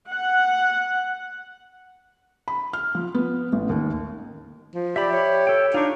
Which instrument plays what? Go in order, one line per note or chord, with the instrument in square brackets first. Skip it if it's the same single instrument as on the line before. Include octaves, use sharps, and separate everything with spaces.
[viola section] F#5
[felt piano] B5
F6
F3
B3
A1
D#2
[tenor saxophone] F3
[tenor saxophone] G4 [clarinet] D5 [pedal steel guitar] E5 B5
[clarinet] C#5
[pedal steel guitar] A4 G5 [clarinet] C#5
[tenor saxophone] D4 [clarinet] D#4 [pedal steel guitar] F4 C#6